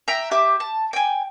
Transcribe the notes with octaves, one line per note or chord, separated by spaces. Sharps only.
E5 G5 A#5
G4 E5 D6
A5
G5 G#5